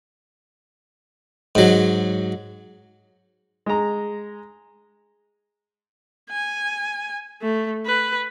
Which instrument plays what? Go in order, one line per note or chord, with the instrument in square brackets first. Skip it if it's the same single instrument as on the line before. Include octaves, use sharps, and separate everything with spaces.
[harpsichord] G#2 F#3
[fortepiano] G#3 A#5
[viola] G#5
A3
B4